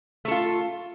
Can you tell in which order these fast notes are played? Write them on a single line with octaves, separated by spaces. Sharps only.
A3 A4 F4